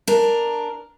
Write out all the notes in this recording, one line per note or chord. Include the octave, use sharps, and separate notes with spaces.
D4 A#4